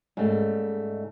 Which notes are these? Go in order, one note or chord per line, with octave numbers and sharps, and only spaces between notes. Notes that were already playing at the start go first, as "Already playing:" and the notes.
G#2 C#3 G3 A3 A#3